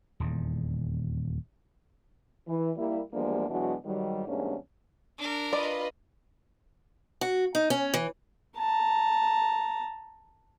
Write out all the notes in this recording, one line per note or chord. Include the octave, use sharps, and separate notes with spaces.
D#1 E2
E3
G3 A#3 E4
E2 F3 G3 G#3 A#3 D4
B2 E3 F#3 G#3 D4 F#4
G#2 D#3 F#3 G3
E2 G#2 G3 A#3 C#4 D4
D4 A#4
F4 B4 D5 D#5
F#4
D#4
C#4
E3
A5 A#5